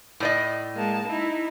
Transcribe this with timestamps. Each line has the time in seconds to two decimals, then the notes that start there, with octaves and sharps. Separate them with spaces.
0.20 A2 D5 D#5
0.75 G#3 A#3 A5
1.06 D#4 E4